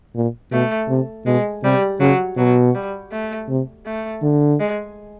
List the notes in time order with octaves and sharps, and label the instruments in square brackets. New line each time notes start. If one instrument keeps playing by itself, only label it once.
[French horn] A#2
[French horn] B2 [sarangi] A3
[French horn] C3
[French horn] B2 [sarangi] G#3
[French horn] C3 [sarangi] G3
[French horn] C#3 [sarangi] F#3
[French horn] B2 [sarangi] F#3
[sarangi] G3
A3
[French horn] C3
[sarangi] A3
[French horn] D3
[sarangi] G#3